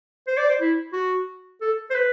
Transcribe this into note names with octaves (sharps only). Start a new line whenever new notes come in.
C5
D5
C5
E4
F#4
A4
C5
B4